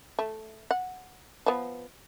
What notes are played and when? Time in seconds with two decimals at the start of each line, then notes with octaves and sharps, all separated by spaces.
0.19 A3
0.71 F#5
1.46 F3 B3